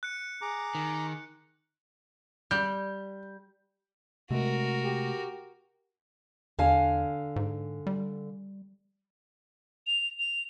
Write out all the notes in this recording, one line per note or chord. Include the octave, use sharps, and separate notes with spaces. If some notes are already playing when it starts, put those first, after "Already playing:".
F#6 C#7
G#4 A#5 D6
D#3
G3 G6
C3 G#3 A3 F#4 A#4
G4
E2 D3 F5 G#5
G#2
G3
F7
F7